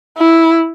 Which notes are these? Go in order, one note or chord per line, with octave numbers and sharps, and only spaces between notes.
E4